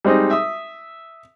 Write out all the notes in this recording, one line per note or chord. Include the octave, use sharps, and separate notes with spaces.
G3 G#3 C4 D#4 D#5
E5 D#6